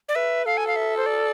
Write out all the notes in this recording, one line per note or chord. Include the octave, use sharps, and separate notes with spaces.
D5
B4 E5
A4 F5
G#5
F5
E5
C5
D5